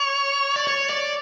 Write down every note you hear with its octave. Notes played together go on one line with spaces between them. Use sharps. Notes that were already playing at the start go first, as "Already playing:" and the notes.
Already playing: C#5
D5
C#5
D5